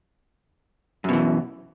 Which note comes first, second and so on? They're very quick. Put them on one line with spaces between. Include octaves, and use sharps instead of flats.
F#2 B2 E3